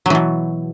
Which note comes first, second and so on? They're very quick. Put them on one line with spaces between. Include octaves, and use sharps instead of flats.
F#3 E3 B2